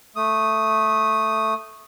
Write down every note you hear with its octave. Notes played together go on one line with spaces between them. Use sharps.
A3 D#6